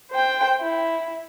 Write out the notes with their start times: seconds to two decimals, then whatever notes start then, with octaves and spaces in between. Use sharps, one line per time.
0.11 C5 G5
0.61 E4